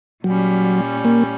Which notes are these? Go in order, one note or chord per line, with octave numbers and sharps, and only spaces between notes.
A#2 F#3 G3 C#4
A#3